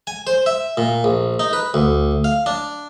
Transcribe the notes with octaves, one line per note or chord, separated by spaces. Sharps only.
G#5
C5
E5
A#2
A#1
D#4
B4
D2
F5
D4